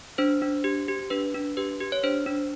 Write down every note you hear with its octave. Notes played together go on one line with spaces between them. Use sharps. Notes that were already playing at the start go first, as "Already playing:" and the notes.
D4 C5
D4
G4
G4
D4 B4
D4
G4 B4
G4
C#5
D4 C5
D4